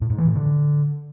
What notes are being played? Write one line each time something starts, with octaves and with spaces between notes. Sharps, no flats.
A2
G#2
E3
A2
D3